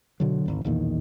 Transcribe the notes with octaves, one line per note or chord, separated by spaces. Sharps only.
B2 D3 F#3
G#1 D2
B1 E2 A#2 D#3